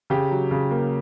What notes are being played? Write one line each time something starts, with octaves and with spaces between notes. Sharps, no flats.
C#3 G4
F#3
C#3
A#3